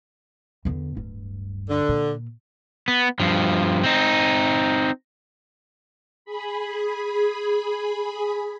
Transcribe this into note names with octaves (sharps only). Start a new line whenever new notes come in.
E2 D3
D1 G2
D3
A#2
B3
G2 F3
C4 D#4
G#4 B5